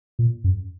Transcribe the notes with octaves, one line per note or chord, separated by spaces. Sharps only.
A#2
F#2